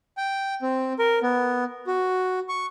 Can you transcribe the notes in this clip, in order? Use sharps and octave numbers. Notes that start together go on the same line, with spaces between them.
G5
C4
A#4
B3
F#4
C#6